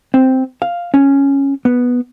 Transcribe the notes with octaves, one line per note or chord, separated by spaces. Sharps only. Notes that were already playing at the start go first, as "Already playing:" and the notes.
C4
F5
C#4
B3